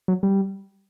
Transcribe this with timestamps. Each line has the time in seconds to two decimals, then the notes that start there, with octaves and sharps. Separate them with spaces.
0.08 F#3
0.23 G3